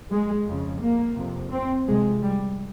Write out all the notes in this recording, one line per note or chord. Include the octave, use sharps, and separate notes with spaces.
G#3
F2 C#3
A#3
F2 C3
C4
F2 C3 G#3
G3